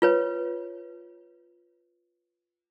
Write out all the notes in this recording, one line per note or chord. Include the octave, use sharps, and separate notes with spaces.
F4 B4 C#5